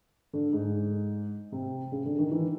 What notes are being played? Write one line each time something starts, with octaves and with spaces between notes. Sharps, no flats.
D3
G#2
C3
C#3
D3
D#3
E3